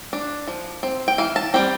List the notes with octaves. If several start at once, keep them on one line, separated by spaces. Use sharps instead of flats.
D4
F3
C4
G5
E3 F5
A5
G3 C4 G5